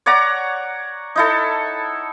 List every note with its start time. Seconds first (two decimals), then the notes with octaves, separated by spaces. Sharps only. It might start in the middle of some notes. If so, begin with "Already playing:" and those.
0.06 C#5 D5 F#5 A#5
1.16 D#4 E4 A4